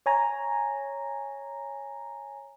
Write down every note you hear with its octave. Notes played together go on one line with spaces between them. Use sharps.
C#5 G#5 A#5